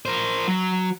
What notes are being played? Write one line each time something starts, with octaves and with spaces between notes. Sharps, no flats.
A#4 C5
F#3